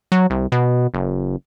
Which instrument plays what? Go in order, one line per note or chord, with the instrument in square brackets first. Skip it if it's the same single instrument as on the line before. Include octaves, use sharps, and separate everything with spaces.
[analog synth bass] F#3
C2
B2
F#1